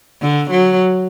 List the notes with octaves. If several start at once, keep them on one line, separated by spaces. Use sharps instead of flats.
D3
F#3